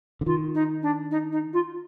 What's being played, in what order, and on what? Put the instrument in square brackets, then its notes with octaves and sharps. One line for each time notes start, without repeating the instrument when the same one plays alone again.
[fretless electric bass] D3
[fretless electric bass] D#3 [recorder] F4
[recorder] D#4
D4
D#4
D#4
F4